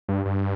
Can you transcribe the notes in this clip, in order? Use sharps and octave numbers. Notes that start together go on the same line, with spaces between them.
G2
G2